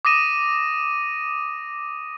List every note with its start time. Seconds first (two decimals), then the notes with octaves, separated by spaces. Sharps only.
0.05 D6 D#6 A#6 D#7 E7